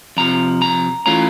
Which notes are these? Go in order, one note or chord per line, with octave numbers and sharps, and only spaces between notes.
F2 C3 F3 A#5
A#5
E3 A3 C#4 F4 A#5